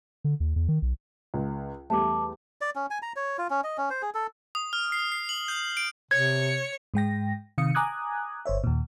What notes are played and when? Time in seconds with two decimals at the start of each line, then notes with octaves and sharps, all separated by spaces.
0.24 D3
0.40 D#2
0.56 E2
0.68 D#3
0.82 B1
1.34 C#2
1.90 E2 G3 A3 A5 D6
2.61 D5
2.76 C#4
2.90 G#5
3.02 A#5
3.16 C#5
3.38 F4
3.50 C#4
3.64 D#5
3.78 C#4
3.90 C5
4.02 G#4
4.14 A4
4.55 D#6
4.73 F6
4.92 C7
5.12 C7
5.29 F#7
5.48 G6
5.77 D7
6.11 C3 C#5 G#6 C#7
6.94 G#2 G#3 G5 A#6
7.58 C3 D#3 F5 D#6 C#7
7.75 G#5 A#5 D6 D#6 F#6 G#6
8.46 G1 C5 C#5 E5
8.64 D#2 A#2